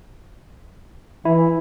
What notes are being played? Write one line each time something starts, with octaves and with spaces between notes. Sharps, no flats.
E3 E4